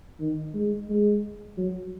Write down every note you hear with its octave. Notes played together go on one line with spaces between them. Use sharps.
D#3
G#3
G#3
F#3